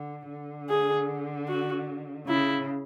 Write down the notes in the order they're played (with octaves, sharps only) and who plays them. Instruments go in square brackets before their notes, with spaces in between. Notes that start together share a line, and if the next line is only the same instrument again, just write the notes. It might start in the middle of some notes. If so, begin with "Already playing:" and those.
Already playing: [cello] D3
D3
[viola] G#4
F#4
[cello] C#3 [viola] E4